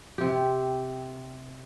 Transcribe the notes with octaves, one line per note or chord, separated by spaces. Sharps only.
C3 G4